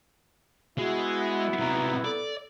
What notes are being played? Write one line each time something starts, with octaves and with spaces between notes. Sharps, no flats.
G#3 B3 E4 F#4
C3 F#3 A#5
A4 D5